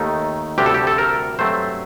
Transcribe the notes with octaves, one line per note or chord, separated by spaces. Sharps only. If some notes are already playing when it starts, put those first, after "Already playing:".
Already playing: D#2 D#3 A3 D#4
D2 C3 G3 D4 G4
A4
G4
A4
A#4
G2 F#3 A3 C4 C5